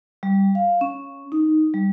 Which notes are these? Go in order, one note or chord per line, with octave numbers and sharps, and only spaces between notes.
G3
F5
C#4
D#4
G3